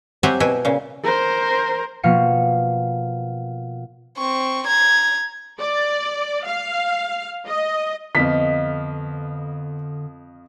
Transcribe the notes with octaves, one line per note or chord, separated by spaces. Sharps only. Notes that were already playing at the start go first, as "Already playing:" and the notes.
F#3 C4 G4 E5 F#5 G#5
B2 B3 E4 G#5
A#2 C#3
A#4 C5
B2 F3 A#3 F5 C#7
C4 C#6
A#5 G#6
D5
F5
D#5
F2 D3 B3 D#5 F5 B6